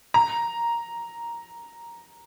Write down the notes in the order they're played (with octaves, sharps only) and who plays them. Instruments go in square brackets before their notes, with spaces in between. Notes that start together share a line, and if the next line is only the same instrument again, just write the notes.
[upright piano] A#5